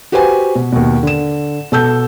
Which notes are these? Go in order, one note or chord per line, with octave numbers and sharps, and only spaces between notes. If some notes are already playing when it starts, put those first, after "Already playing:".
F#4 G4 B4 C5 G#5
B2
D#2 B2
D3 E7
B2 A4 A5 E6 G6